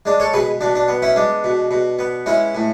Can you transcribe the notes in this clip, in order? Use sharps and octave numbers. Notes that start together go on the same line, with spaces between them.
G#3 D4
A4 C#5
B2 G#4 B4
B2 D4
D4
B3
C#4 E4
G#3 D4
B2
B2
B3
G#3 C#4 E4
A2